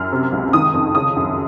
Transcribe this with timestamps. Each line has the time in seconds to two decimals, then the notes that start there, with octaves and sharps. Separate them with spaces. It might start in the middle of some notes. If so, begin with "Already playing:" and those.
Already playing: F#2 F6
0.12 C3
0.32 C#2
0.53 D#3 D#6
0.74 F2
0.95 C#3 D#6
1.17 F#2